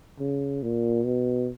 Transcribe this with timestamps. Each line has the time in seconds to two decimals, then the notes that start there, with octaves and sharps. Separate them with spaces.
0.19 C#3
0.62 A#2
1.05 B2